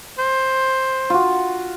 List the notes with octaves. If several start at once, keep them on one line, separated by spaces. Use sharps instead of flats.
C5
F4 F#4